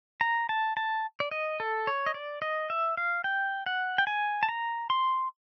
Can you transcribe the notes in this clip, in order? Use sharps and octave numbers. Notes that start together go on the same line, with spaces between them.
A#5
A5
A5
D5
D#5
A4
C#5
D#5
D5
D#5
E5
F5
G5
F#5
G5
G#5
A5
A#5
C6